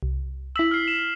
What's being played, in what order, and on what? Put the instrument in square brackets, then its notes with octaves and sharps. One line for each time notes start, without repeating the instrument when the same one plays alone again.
[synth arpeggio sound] C2
[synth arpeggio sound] E4 E6 [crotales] B6 F#7
[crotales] F6 C7
E7